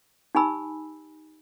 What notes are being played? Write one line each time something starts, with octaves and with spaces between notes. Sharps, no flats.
D#4 G4 G#5 B5 E6